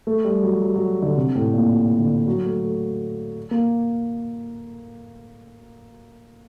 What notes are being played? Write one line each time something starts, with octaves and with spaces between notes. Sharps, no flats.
A3
G3
F#3
F#3
F#3
D3
C3
A2
A#2
D3
F#3
A3
A3
A#3